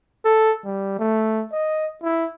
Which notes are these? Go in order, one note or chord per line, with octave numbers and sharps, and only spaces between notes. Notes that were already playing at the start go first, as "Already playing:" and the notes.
A4
G3
A3
D#5
E4